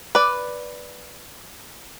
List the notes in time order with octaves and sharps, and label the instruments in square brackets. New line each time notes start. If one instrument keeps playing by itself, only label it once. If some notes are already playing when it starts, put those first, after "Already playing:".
[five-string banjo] B4 D5